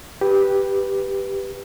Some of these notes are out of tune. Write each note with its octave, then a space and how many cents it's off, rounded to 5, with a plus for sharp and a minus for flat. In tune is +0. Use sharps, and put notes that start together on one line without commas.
G4 +0 B4 -5